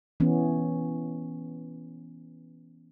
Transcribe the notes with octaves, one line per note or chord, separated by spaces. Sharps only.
E3 B3 C#4